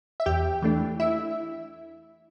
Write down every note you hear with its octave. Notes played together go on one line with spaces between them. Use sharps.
E5
E2 G4 G5
E3 A3 D4
E4 E5